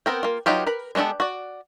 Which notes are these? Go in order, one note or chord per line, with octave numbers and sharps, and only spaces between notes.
B3 C4 A#4 G5
A#3 F4
F#3 D#4 F4 G4 B4
A#4 B4 B5
G#3 B3 D4 G4 A4
F#4 D5